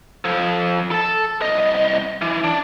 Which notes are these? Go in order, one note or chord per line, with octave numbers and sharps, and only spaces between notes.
F3 A4
A4 A5
C2 D#5
E3
D4